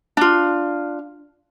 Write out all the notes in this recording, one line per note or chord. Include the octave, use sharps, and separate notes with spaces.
D4 F4